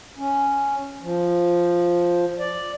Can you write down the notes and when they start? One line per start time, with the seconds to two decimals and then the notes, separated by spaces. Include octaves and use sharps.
0.18 C#4
1.03 F3
2.39 D5